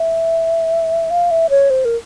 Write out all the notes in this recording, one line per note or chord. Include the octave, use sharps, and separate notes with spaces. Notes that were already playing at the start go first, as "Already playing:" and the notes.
Already playing: E5
F5
E5
C#5
C5
A#4